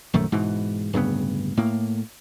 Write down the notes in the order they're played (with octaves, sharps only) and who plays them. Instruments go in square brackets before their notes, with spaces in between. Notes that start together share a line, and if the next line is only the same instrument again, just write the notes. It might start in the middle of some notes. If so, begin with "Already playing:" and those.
[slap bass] A#1 F#2 D#3 A3
G#2 B2 E3
D1 G2 C#3 B3
A2 A#3